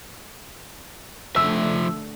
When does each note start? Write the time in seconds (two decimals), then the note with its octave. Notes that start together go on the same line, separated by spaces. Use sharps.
1.36 D3 F3 A3 E5 E6